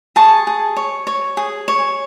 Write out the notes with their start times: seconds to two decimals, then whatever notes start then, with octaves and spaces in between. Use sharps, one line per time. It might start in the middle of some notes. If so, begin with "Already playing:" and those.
0.16 G#4 A5 C#6
0.47 G#4
0.77 C#5
1.07 C#5
1.37 G#4
1.68 C#5